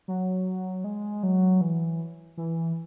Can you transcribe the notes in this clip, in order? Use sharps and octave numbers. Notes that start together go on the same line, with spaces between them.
F#3
G#3
F#3
E3
E3